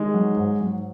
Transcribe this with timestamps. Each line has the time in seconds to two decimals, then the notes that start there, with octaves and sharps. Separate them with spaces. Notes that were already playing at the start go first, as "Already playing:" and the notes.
Already playing: D#3 G#3
0.14 F#3
0.37 G#2
0.60 F#3